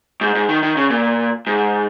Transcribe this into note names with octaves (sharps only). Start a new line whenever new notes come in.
G#2
G#2
D#3
D#3
C#3
A#2
G#2